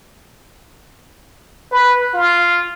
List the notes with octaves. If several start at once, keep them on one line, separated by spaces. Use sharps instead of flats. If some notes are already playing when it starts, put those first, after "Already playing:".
B4
F4